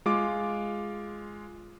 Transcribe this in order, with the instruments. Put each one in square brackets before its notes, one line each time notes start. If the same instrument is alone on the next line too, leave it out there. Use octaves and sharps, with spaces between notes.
[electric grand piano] G#3 F4 D6